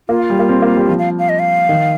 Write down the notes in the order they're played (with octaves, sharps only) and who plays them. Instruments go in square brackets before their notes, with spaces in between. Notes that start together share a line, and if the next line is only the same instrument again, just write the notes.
[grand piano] A#3 [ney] F4
[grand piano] G3
A#3
C4
A#3
G3
F3
[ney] F5
F5
D#5
F5
[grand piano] D#3